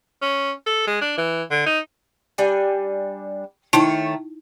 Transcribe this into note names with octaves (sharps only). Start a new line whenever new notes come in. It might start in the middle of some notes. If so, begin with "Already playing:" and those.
C#4
A4
G#3
D4
E3
D3
D#4
G3 D4 G#5
D#3 A3 D#4 E4 C#5 A5